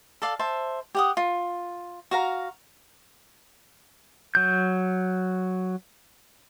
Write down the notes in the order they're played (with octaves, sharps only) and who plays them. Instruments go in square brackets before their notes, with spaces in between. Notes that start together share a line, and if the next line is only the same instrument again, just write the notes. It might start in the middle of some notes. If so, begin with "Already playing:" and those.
[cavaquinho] A4 D5 F5
C5 E5 A5
G4 F#5 D#6
F4
F#4 F5 A#5
[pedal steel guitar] F#3 G6